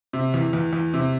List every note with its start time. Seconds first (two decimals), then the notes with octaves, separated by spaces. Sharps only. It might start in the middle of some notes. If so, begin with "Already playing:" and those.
0.13 C3
0.34 E2
0.53 E2
0.73 E2
0.94 C3